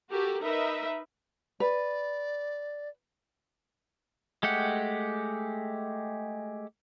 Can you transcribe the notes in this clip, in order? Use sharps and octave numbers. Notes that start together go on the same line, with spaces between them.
F#4 G4 A4 A#4
D#4 A#4 B4 D#5 E5
B4 D5
G#3 A3 G4 F#5